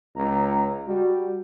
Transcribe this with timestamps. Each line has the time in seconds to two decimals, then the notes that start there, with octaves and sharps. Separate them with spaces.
0.16 C#2 A#5
0.87 G3 F#4